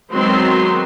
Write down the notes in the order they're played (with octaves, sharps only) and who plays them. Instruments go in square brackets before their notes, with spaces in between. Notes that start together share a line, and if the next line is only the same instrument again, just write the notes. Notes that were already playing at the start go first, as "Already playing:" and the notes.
[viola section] D#3 F#3 G#3 B3 C4 C6